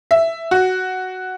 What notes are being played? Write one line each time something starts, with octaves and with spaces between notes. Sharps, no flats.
E5
F#4